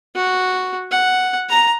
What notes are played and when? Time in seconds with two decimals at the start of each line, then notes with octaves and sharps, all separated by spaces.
0.16 F#4
0.91 F#5
1.49 A#5